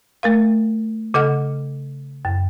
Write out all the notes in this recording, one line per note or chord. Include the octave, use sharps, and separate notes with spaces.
A3 A#4 F5
C#3 A4 D#5 F#5 F6
F#2